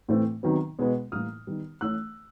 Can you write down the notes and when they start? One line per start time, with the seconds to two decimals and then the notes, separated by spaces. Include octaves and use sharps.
0.09 A2 E3 A3 C4
0.43 C3 D#3 F#3 B3
0.79 B2 G#3 B3
1.12 A2 E3 G3 A#3 D#6 F6
1.47 D#3 G3 B3
1.81 E3 A3 C#4 E6 F#6